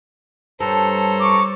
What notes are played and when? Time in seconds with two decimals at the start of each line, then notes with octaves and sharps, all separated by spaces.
0.60 G2 A4 C5 C#5 A#5
1.21 C#6 D6